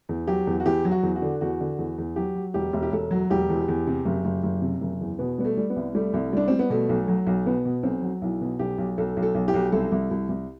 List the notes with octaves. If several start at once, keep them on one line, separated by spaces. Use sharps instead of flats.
E2
F#3 G4
E2
F#4
E2 G4
F#3
F#4
E2
F#4
D3
E2 F#4
D3
E2
E2
F#3 G4
F#3
E1 G4
E1
G4
E1 A4
F#3
E1 G4
E2
E2
C3
F#1
F#1
F#1
C3
F#1
E2
B2 B3
G3 B3
A3
G3
B3
C2
G3 A3
C2
G3 D4
G3 C4
B3
B2 A3
B1
F#3
B1
B2 B3
B2
B1 C4
F#3
B1 E4
B2
B1 G4
B1
B1 A4
B1
A4
B1
G4
B1
C2 A4
C2
C2
C2